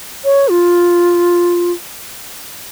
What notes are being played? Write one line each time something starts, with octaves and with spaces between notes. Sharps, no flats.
C#5
F4